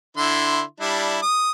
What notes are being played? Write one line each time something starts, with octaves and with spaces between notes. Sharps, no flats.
D3 E4 C6
G3 D4 E4
D#6